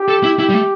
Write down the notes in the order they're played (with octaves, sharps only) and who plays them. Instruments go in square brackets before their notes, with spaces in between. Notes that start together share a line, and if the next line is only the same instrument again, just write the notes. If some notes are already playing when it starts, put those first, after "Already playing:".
Already playing: [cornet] G4
[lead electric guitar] A4
E4
[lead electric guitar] E4 [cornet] G4
[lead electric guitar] G3
A3